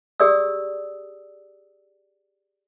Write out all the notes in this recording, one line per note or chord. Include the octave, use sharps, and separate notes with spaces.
G4 G#4 D5 D#6 E6